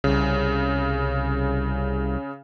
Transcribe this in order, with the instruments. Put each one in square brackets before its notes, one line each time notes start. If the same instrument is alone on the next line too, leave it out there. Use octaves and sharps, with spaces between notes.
[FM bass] C2 [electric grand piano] C#3